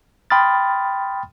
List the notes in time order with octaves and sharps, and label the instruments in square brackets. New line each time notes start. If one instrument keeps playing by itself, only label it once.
[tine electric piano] G5 B5 C6 D#6 F6 A6